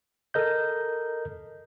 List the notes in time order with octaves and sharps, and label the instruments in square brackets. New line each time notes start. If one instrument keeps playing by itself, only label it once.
[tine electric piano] A4 A#4 D#5 G6